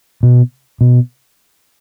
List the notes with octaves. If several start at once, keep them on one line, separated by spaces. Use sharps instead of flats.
B2
B2